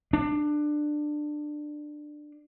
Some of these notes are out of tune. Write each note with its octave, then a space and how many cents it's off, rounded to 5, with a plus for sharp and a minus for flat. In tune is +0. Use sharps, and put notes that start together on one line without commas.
D4 +20